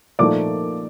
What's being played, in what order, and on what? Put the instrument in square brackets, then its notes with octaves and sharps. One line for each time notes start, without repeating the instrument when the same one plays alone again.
[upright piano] A#2 F3 A3 D#4 D5 D6